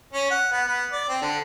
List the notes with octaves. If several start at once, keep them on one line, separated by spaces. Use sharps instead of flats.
C#4
F#5
B3
B3
D5
C4
D3